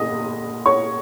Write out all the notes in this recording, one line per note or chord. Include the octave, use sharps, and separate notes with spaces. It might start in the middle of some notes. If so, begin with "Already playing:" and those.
Already playing: A#2 D#5 D#6
C#5 C#6